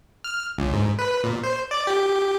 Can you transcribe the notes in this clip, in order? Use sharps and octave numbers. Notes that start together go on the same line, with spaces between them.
F6
C#2
G#2
B4
A#2
C5
D5
G4